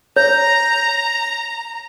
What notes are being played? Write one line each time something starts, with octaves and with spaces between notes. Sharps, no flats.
C#5 A#5